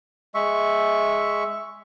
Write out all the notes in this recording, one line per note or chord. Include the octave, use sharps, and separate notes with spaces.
G#3 E5 C#6